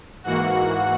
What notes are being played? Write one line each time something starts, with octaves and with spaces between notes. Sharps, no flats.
G#2 E3 A#3 F#4 F#5